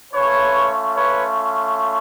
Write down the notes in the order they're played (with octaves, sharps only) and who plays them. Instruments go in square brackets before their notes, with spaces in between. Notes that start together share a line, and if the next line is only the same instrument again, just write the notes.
[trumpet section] A3 C#4 F4 B4 C#5
B4 C#5